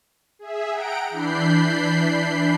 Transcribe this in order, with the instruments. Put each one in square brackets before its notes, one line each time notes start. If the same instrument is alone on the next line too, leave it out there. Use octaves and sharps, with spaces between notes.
[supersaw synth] G#4 E5
F#5 G5 A#5 D7
E3 D4 B5 G6 C7